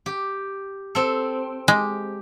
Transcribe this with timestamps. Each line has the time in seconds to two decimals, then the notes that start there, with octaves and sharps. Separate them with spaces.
0.06 G4
0.95 C4 A4
1.68 G#3 G4